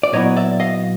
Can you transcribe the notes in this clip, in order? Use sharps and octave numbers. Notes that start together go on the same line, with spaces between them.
D5
A#2 F#3 B3 E4 C#5 D#5
D5 E5
D#5 F5